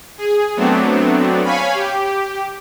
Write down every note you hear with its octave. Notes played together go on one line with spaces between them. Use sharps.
G#4
F#3 A3 B3 C4 D4
C#5 F5 G#5 B5
G4